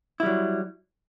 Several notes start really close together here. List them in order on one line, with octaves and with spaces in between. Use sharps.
E4 G3 F#3